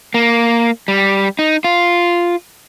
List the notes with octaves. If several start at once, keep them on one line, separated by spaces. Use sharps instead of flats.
A#3
G3
D#4
F4